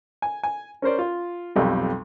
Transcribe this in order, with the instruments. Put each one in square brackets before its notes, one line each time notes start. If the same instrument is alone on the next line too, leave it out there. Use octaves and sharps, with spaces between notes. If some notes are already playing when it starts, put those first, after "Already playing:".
[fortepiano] G#5
G#5
C#4 A#4 C5 D5
F4
B1 F2 G3